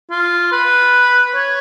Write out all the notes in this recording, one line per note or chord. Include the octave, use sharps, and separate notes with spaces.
F4
B4
C#5